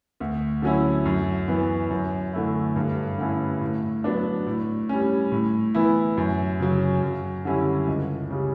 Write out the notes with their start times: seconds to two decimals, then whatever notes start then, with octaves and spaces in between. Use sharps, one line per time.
0.20 D2
0.62 D3 F#3 C#4 E4
1.05 F#2
1.48 E3 B3 E4
1.90 F#2
2.33 D3 A3 E4
2.76 G2
3.18 D3 A3 C#4 E4
3.61 A2
4.04 F#3 B3 D4
4.47 A2
4.89 G3 C#4
5.32 A2
5.74 E3 B3 E4
6.17 F#2
6.60 C#3 F#3
7.02 F#2
7.45 D3 G3 C#4 E4
7.88 C#2
8.30 C#3 G3